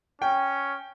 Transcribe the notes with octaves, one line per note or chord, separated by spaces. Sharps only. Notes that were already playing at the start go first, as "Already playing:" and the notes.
C#4 G5